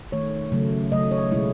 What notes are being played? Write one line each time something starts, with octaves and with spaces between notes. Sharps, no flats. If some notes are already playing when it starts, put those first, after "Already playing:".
D#3 A3 C#5
C#3 F#3 A3
C#3 F#3 A3 D#5
C#5
B2 G#3 E4